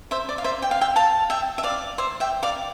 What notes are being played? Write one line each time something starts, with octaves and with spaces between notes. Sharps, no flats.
C5 E5
D5
F5
C5 E5
G5
F5
E5 G5
F5 A5
E5 G5
E5
D5 F5
C5 E5
E5 G5
D5 F5